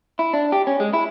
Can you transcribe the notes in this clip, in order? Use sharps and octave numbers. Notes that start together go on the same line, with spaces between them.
E4
D4
G4
C#4
G#3
E4